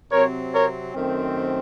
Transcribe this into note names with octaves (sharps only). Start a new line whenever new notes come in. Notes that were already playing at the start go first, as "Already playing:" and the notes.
C3 F#3 C4 A#4 C#5
A#4 C#5
F#2 D#3 A3 C4